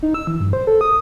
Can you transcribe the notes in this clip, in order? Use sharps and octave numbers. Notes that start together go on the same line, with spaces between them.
D#4
E6
E3
G2
C5
A4
D#6